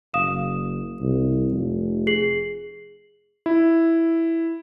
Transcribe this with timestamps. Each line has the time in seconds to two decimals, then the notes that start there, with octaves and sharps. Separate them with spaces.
0.14 F#1 F5 D#6 E7
1.01 C2
1.52 F1
2.07 G#4 C7 F#7
3.46 E4